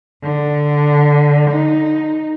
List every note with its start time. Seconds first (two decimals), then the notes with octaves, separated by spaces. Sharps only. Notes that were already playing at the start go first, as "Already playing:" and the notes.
0.23 D3
1.51 D#4